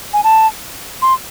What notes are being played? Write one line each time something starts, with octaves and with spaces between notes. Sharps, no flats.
G#5
A5
C6